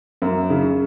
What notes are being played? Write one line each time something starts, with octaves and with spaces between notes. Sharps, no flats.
F#2
C#3